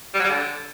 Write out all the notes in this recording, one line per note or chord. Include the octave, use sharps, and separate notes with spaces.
G3
F#3
G3
D3